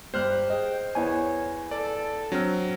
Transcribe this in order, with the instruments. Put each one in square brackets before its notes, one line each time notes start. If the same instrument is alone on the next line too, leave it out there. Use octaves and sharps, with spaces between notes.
[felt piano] G1 [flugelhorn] G4 [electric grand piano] C5 F6 F#6
[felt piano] G#4 [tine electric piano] D#5 [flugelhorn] G5
[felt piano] E2 B3 [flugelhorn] C#5 [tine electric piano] G#5
[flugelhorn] A4 [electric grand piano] D5
[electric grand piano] F#3 C4 [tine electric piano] D4 F6